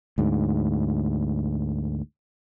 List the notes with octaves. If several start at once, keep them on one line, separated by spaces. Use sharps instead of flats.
D2 G#2